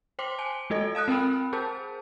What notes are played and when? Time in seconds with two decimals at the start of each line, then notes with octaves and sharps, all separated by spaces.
0.19 C5 G5 C6 D6
0.38 G#5 A5
0.70 G#3 F4 A4 D#5
0.95 F5 A5 D#6 F#6
1.08 C4 A#4 G5 B5
1.53 G#4 A#4 C5 A5